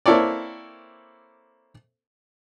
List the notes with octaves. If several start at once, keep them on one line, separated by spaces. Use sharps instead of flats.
A#3 C4 E4 A4 C#5 D5